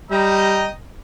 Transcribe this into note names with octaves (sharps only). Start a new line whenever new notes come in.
G3 D#5 G5 A#5